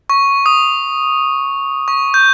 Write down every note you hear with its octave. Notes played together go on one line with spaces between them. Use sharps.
C#6
D#6
C#6
G6